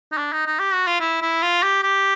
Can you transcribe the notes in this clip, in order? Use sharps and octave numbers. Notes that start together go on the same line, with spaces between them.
D#4
D4
D#4
D#4
G4
F#4
F4
E4
E4
F4
G4
G4